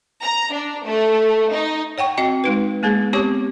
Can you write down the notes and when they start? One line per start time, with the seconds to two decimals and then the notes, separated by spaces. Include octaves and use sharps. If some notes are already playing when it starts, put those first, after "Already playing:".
0.23 A#5
0.53 D4
0.86 A3
1.52 D#4
1.98 C#5 F#5 G5 C#6
2.17 C4 F#4 D#5 G5 A5
2.44 G#3 D#4 B4
2.83 G#3 A#3 B3 G#4
3.13 B3 C4 G4 C#5 C#6 D6